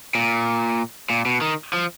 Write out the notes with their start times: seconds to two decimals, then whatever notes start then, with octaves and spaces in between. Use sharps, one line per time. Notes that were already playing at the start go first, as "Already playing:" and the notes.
0.15 A#2
1.10 A#2
1.26 B2
1.41 D#3
1.73 F3